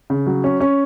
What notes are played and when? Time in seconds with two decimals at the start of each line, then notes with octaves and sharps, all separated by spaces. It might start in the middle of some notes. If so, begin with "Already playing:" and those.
0.10 C#3
0.27 F#3
0.44 C#4
0.60 C#4